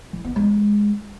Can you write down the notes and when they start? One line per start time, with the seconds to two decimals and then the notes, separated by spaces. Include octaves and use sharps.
0.13 E3
0.25 B3
0.36 G#3